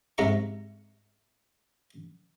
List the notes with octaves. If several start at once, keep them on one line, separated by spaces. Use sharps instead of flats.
G#2 C3 E5 A#5 C#6